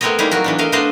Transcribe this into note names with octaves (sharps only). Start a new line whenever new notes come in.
A3 B3 C4 A#4 C#5 D#5
G3 A#3 D#4 E4 G#4
F#3 F#4 A#4
E3 B3 D4
A3 A#4 D#5 F5
A3 B3 D4 C5 D#5 F5